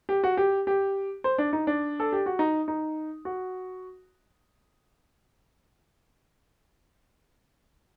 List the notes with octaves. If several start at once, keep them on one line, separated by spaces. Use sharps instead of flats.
G4
F#4
G4
G4
C5
D4
D#4
D4
A4
G4
F#4
D#4
D#4
F#4